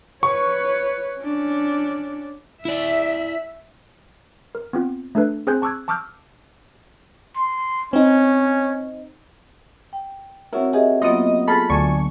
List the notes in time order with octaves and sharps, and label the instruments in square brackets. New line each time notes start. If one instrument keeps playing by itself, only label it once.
[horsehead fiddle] B4 C#5 [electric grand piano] C#6
[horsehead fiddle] C#4 D4
[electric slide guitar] E4 D5 [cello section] E5
[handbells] A#4
B3 C4 F4
A3 D4 A4 B4
C4 G#4 C5 G#5 F#6 G6
A5 C#6 D6 E6 F#6 G#6
A5 C#6 D6 E6 F6 G6
[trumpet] C6
[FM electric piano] C4 D#4 [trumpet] C#4
[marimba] G5
[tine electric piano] C4 F#4 A#4 [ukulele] E4 [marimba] C#5
[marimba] G4 D#5 E5 [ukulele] G#4
[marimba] F#3 A#3 B3 [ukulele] F4 F#5 [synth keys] D#5 D#6
[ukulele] F4 G#4 A4 [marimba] A5 F6 A6 [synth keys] B5
[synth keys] D2 C#6 [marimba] F#3 [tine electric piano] D5 G#5 A5